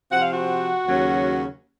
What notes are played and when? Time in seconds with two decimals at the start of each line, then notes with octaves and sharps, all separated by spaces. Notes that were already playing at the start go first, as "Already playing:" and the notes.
0.11 C3 F3 C4 F#5
0.22 F5
0.32 F#4 F#5
0.85 D#2 C#3 F#3 C#4